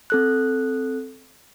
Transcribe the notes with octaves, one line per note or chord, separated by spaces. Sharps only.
C4 A4 F#6